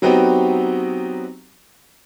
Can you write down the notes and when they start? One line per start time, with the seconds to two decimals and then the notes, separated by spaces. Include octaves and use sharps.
0.02 F#3 B3 C4 D#4 F#4 G4